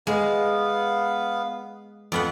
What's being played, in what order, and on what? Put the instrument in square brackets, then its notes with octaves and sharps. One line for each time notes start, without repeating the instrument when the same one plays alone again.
[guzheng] G#3 [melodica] B3 F5
[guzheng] F2 B3 F#5